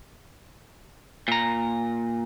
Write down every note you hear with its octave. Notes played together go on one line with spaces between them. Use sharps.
A#2 A#5